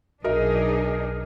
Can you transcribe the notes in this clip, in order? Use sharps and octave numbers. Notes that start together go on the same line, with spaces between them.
B1 D4 D#4 F#4 G#4 A#4 D#5 E5